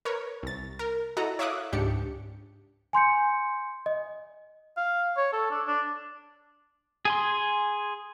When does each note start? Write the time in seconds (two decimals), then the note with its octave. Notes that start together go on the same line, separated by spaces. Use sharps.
0.05 A#4 B4 C#5
0.43 C2 A6
0.79 A#4
1.17 E4 F#4 A4 D#5 F#5 A#5
1.39 C#5 E5 F5 D6 D#6 F#6
1.72 C#2 G#2 D4 G4 C#7
2.93 G#5 C6 G6 C#7
3.86 D#5
4.77 F5
5.17 C#5
5.33 A4
5.51 D4
5.67 D4
7.05 G#4 G#5 C6